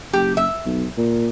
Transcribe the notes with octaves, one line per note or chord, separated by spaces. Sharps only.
F#1 G4
E5
B1
A#2